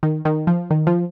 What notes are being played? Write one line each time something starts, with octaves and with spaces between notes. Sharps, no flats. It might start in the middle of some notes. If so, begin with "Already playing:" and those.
D#3
D#3
F3
D#3
F3